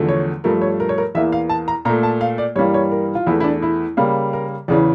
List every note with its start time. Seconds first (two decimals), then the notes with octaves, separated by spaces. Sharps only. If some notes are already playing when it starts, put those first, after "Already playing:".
Already playing: E2 D3 F3 A3
0.09 C#5
0.44 G2 F3 A3 A#4
0.62 C#5
0.80 A#4
0.89 C#5
0.98 A#4
1.15 E2 E3 A#3 E5
1.32 F5
1.49 A5
1.68 A#5
1.85 A#2 A#5
1.89 A3
2.03 A5
2.21 F5
2.38 D5
2.56 G2 E3 G3 A#3 C#5
2.74 C#5
2.92 A#4
3.15 F4
3.27 E2 E3 A3 E4
3.40 E4
3.44 D4
3.62 E4
3.97 C#3 G3 A#3
4.33 A#4
4.68 E2 C#3 E3 D5